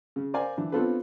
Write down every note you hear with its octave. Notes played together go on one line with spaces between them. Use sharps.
C#3
A#4 C5 D5 F5 G#5
E3 D4
B3 C4 D4 F4 A4 B4